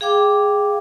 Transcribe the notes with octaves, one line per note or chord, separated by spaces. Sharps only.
G#4 F5 G5 D6